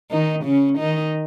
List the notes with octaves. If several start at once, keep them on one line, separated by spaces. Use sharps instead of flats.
D#3 D#4
C#3 C#4
D#3 D#4